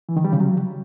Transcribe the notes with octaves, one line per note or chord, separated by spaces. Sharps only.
E3
D#3
G3
C#3
F#3